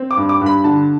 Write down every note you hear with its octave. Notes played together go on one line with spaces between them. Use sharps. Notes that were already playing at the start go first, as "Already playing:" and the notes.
Already playing: C4
D6
G2
D6
G2
B5
D3 A5